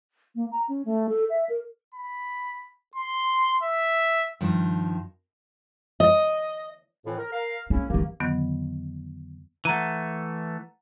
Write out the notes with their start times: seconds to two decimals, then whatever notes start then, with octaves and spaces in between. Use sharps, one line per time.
0.35 A#3
0.51 A#5
0.68 C#4
0.85 A3
1.09 A4
1.30 E5
1.49 A#4
1.94 B5
2.95 C6
3.63 E5
4.41 G2 D#3 F3
6.00 D#5
7.06 F2 A2 E3
7.18 A#4
7.33 A#4 F5
7.70 C#3 A#3 C#4 E4
7.90 E3 A#3 C#4 G4
8.20 F2 D3 D#3 F#3 B3
9.65 E3 A3 F#5 A#5 D#7